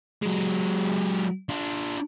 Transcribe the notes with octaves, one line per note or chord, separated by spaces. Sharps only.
F#3 G#3
D4 F4